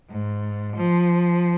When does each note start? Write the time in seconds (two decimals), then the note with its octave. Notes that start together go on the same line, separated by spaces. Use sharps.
0.10 G#2
0.75 F3